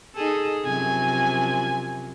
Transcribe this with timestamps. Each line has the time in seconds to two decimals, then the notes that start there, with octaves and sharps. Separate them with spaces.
0.15 D#4 G#4 A4
0.65 F#2 C3 F3 G#5